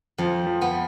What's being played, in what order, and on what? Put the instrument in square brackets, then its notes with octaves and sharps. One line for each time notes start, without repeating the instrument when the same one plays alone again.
[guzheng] F2 [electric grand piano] F3
[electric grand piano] F3
[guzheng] B3